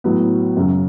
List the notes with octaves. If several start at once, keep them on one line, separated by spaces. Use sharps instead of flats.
A2 F#3 B3
F#2 C#3 F#3